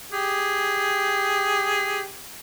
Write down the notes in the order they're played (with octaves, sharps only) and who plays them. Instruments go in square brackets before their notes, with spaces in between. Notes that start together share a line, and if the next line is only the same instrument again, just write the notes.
[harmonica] G4 G#4